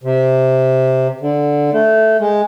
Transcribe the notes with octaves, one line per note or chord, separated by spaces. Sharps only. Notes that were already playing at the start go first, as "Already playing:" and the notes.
C3
D3
A3
G#3